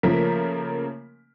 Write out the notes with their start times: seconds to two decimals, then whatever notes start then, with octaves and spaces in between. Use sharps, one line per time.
0.03 C#3 F3 A3 A#3 A#4 B6